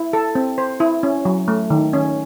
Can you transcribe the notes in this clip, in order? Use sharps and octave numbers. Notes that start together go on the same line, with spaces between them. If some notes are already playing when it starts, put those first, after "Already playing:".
Already playing: E4
A4
C4
C5
E4
C#4
F#3
A3
D#3
C#4